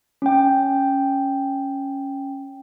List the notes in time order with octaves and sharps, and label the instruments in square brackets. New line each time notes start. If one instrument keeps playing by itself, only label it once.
[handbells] C#4 G5